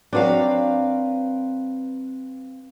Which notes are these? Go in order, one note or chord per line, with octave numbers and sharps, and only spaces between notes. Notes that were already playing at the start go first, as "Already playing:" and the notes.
F#3 C4 D4 B4 F5